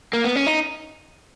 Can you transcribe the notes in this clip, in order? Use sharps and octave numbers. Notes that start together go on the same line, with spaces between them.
A#3
B3
C#4
D#4